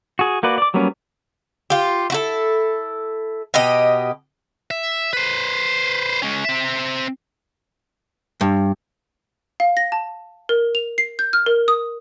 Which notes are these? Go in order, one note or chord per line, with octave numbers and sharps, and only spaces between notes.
F#4 G#4
A#3 F#4 B4 D5
D5 D6
F#3 G3 A#3 B3 C#4
F4 G4
E4 F#4 A4
B2 G4 D#5
E5
B4 C5
G#3 C#4
C4 E5
G2
F5
A#6
A5
A#4
F7
C7
G6
F6
A#4
D#6